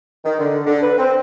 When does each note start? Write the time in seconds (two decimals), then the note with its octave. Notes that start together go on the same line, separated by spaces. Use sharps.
0.24 D#3
0.38 D3
0.66 D3
0.82 B4
0.97 C4